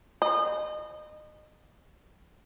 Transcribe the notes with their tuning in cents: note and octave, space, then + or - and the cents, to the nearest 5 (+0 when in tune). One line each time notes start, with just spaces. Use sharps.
D#5 -30